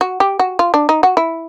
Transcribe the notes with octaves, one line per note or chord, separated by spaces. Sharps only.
F#4
G4
F#4
F4
D4
D#4
F#4
E4